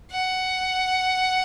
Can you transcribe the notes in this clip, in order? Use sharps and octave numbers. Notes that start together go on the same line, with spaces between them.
F#5